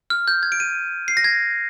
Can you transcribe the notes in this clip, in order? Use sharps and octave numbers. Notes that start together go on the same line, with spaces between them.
F6
G6
G#6
D7
D#7
C7
A#6
G#6